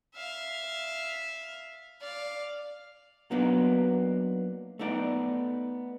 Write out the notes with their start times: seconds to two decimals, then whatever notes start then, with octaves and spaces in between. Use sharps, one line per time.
0.14 E5 F5
2.00 D5 F5
3.31 F#3 A#3 B3 D4 D#4
4.79 A3 B3 D#4 D5